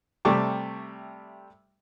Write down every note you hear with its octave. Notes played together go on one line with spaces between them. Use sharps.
C3 G3 A3 A5 C#6 D6